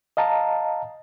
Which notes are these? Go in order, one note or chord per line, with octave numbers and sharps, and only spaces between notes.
D#5 F5 A5 A#5